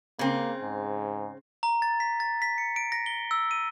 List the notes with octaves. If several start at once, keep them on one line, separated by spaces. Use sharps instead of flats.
C#3 A#3 C4
G#2
A#5
A6
B6
A6
B6
C#7
D7
A#6
G7
E6
D#7